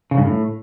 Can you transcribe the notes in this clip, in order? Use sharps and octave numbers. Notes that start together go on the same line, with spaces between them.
C#3
G2
A2